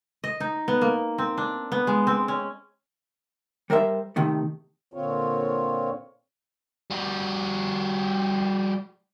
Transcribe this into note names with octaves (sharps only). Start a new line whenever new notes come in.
D#5
D#4
B3
A#3
C4
D4
B3
G#3
C4
C#4
G3 A#4 C5 E5
C3 D#3 A3
A#2 D3 C4 F4 C#5
G3 F#4